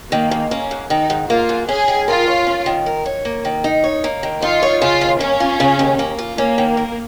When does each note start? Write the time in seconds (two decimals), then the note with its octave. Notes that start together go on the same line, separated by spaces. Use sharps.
0.11 D#3 A#3
0.31 G#2
0.51 A#3 C#4
0.71 G#2
0.90 D#3 D#4
1.10 G#2
1.30 A#3 F4
1.49 G#2
1.68 C#4 G#4
1.88 D#3
2.08 F4 A#4
2.28 C#5
2.47 C#4
2.66 D#3
2.86 A#4
3.06 C#5
3.25 A#3
3.45 D#3
3.64 D#4
3.84 C#5
4.04 A#3
4.23 D#3
4.42 D#4 F4
4.63 C#5
4.82 C#3 F4
5.01 D#2
5.21 A#3 C#4
5.40 F4
5.60 C#3
5.79 D#2
5.99 A#3
6.19 F4
6.38 A#3 C#4
6.58 D#3
6.77 A#4